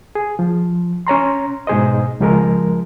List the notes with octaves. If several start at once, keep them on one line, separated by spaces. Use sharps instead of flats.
G#4
F3
C#4 C#5 A#5 C6
G#2 B2 G#4 C5 D#5
C#2 F3 G#3 A#4